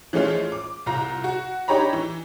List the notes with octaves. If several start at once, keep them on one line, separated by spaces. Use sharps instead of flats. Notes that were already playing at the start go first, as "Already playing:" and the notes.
E3 F3 G#3 A3 C#4 F4
D6
C2 F4 A#5
F#4
D4 D#4 G4 C#5 A#5 B5
E3